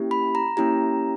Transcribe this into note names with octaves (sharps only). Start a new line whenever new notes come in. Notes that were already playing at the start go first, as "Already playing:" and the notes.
Already playing: A#3 C#4 E4 G4
B5
A#5
A#3 C#4 E4 G4 A#5